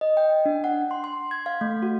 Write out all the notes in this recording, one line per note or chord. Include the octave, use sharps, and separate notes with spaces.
D#5
G5
D4
F#5
C6
C6
G#6
F5
A3
F#4